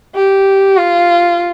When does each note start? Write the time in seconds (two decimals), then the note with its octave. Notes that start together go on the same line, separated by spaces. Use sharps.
0.15 G4
0.77 F4